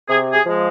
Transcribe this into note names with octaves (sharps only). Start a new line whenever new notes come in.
C3 G#4
G#4
F3 G#3